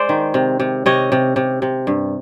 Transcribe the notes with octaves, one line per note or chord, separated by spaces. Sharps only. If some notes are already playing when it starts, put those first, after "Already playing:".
Already playing: G#3 C5 D5
D#3
C3
C3
C3 C#5 D#5
C3
C3
C3
G2